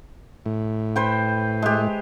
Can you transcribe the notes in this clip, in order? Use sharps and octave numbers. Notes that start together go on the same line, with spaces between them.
A2
B4 C5 G5
G#3 G4